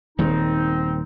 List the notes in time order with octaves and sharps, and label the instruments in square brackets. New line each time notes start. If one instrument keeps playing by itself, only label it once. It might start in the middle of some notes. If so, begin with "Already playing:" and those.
[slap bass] D#1 D#3 G#3 [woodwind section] C4 D#4